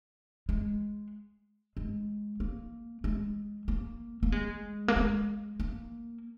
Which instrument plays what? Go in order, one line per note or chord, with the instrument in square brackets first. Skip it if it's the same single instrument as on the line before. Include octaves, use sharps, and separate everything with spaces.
[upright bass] G#3
G#3
A#3
G#3
A#3
A#3
G#3
A#3
G#3
A#3